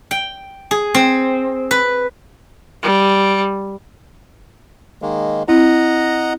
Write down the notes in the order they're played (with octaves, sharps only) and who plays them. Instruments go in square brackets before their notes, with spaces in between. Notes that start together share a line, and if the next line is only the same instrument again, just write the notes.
[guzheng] G5
G#4
C4
B4
[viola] G3
[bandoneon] D#3 G#3 A#3
[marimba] C4 E4 [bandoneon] D#5 F#5 A#5